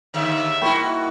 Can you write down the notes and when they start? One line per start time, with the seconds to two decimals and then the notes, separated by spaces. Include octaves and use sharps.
0.14 D#2 G#2 D3 E5
0.62 G#2 C#3 A#3 E4 F#4 G5 B5 C#6